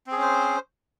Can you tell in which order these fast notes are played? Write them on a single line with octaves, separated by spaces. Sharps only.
C4 G#4 C#4 C5